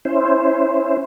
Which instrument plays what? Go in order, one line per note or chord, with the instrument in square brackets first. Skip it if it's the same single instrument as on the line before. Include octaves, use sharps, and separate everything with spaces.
[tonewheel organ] C#4 E4 C5